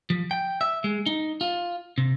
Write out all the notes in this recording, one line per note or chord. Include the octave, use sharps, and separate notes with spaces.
F3
G5
E5
G#3
D#4
F4
C3